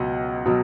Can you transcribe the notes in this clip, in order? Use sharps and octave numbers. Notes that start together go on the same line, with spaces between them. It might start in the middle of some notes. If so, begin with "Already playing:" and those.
Already playing: C#2 B2 F#3 D#5 F#5
B2 F#3